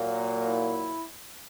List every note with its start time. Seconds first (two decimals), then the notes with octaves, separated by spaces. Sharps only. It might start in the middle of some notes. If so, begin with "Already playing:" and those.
Already playing: A#2 F#3 A#3
0.46 E4